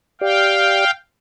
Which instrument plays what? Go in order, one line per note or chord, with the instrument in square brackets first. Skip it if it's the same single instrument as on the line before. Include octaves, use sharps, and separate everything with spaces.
[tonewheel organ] G4 D5 [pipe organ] F5 G5